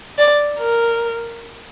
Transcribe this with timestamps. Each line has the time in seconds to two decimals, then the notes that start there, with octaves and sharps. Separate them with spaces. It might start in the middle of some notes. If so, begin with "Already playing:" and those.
0.18 D5
0.59 A#4